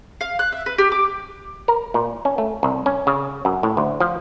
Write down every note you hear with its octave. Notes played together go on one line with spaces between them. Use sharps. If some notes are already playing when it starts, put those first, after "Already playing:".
F5
F#6
E5
B4
G4
D6
A#4
A#2
C#4
A3
C2
C#4
C#3
F#2
A2
D2
F3